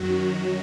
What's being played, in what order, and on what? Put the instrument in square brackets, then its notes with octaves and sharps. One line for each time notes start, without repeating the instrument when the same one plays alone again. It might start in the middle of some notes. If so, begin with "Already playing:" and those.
Already playing: [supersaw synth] F#2 D#3 F#3 F#4